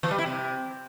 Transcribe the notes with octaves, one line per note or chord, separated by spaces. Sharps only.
E3
G3
E4
C3